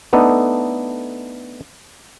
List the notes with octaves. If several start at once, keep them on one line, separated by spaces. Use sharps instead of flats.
A3 B3 D4 D#4 A4